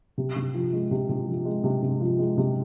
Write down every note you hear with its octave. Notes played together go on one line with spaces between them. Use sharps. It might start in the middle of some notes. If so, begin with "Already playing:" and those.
C3
C3
F3
G#3
C3
C3
F3
G#3
C3
C3
F3
G#3
C3